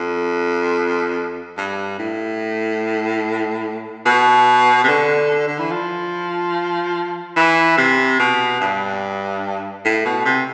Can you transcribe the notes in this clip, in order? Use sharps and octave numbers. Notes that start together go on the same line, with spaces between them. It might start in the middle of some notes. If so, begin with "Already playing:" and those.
Already playing: F2
G2
A2
B2
C3
D3
D3
E3
F3
E3
C3
B2
G2
A2
B2
C3